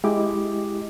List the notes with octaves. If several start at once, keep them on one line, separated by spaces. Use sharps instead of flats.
G#3 E4 G4 D#5 D6